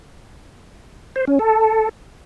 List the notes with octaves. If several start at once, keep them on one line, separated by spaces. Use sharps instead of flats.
C5
C#4
A4